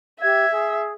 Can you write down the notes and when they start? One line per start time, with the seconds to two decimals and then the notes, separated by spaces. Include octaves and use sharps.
0.21 G4 E5 G#6
0.53 G#4